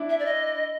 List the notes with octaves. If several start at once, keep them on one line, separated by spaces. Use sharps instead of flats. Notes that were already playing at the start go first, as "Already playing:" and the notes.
Already playing: D4 E4
E5
D5
D#5